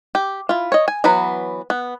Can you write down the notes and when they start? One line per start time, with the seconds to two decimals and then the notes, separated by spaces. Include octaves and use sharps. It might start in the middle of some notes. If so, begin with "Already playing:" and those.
0.15 G4
0.49 E4 F4
0.72 C#5 D#5
0.88 G#5
1.04 E3 F#3 B3 A#5 B5
1.70 B3